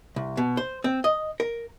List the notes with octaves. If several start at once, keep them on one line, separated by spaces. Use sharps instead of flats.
C2
B2
C5
C4
D#5
A#4